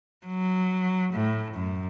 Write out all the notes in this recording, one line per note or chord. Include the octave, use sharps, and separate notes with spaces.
F#3
A2
F#2